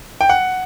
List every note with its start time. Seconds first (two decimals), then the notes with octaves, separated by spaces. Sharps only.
0.21 G5
0.29 F#5